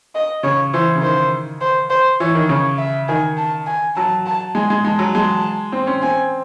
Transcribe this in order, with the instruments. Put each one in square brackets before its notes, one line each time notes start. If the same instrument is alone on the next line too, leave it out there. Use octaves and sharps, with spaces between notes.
[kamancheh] D#5
[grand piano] C#3 [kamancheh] C#5
[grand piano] E3 [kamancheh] C5
[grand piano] C#3
[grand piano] D#3 [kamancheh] C5
[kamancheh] C5
C5
[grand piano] E3 [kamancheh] C#5
[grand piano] D#3
[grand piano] C#3 [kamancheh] C#5
[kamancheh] E5
[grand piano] D#3 [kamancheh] G#5
[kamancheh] A5
G#5
[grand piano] F#3 [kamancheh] A5
[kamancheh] A5
[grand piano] G#3 [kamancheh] G#5
[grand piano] G#3
[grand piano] G#3 [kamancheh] A5
[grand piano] F#3
[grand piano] G#3 [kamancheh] A5
[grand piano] C4
C#4
[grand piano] C4 [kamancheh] G#5